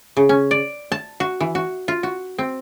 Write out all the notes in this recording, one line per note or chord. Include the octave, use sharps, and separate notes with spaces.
C#3
C#4
D5
A5
F#4
E3
F#4
F4
F#4
C4